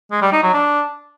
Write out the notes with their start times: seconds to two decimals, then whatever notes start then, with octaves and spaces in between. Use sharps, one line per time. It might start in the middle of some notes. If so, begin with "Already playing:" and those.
0.11 G#3
0.22 G3
0.32 D#4
0.43 F#3
0.53 D4